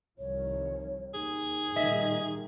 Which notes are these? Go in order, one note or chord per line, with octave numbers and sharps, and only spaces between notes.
C2 D#3 F3 C#5
D#2 D#4 G#4
A#2 D#3 G3 D#5 E5